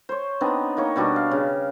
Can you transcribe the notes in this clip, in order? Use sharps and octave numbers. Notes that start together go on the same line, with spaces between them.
C5 C#5
B3 C4 D4 D#4
A#3 D#4 C#5
B2 G3 D4 F#4
F5
C#3